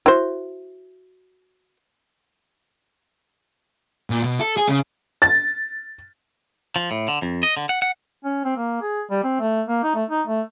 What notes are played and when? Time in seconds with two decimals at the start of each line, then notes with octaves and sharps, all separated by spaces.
0.06 E4 F#4 C5
4.10 A#2
4.24 B2
4.40 A4
4.57 G#4
4.69 C#3
5.22 A6
6.76 F3
6.91 A2
7.08 D3
7.22 F2
7.43 D#5
7.57 D3
7.69 F#5
7.82 F#5
8.25 C#4
8.45 C4
8.57 A#3
8.82 G#4
9.11 G3
9.24 C4
9.40 A3
9.68 A#3
9.83 D#4
9.95 A3
10.10 D#4
10.27 A3